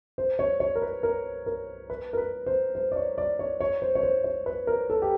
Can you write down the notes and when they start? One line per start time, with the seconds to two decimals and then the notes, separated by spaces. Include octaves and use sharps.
0.18 C5
0.39 C#5
0.60 C#5
0.75 A#4
0.82 B4
1.03 A#4
1.46 A#4
1.90 B4
2.13 A#4
2.17 B4
2.46 C5
2.75 C5
2.92 D5
2.96 C#5
3.18 D5
3.39 C#5
3.60 C#5
3.82 C5
3.95 C#5
4.03 C5
4.24 C#5
4.46 B4
4.67 A#4
4.90 A4
5.02 G4